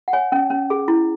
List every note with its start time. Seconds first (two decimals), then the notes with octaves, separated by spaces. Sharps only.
0.08 F#5
0.13 C#5 G#5
0.32 C#4
0.50 C#4
0.70 G#4
0.88 E4